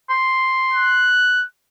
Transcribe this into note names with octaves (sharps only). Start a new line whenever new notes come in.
C6
F#6